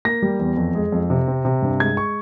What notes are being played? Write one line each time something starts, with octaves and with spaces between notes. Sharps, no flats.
A#3 A#6
G3
E2
F2
G#3
F2
C3
C4
C3
G2
G#3 G#6
C#6